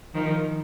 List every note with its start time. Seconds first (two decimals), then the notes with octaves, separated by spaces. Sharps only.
0.14 D#3 F3